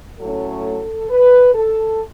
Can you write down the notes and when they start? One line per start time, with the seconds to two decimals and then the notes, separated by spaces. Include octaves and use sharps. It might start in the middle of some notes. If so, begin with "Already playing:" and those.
0.18 A2 F#3 A3 C#4 A4
1.10 B4
1.55 A4